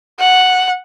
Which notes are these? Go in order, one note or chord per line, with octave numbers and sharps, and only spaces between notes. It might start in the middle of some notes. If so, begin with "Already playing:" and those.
F#5